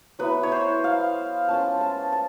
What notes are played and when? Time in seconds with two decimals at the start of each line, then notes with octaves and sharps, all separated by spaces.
0.19 F#3 B3 E4 B4
0.43 C#5
0.52 C5
0.84 F5
1.48 G#3 C#4 F4 A5
1.81 A5
2.12 A5